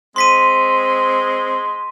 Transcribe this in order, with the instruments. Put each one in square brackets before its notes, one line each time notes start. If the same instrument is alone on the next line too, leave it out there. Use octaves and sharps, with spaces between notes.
[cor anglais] G#3 [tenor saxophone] C4 [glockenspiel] C6 B6 D#7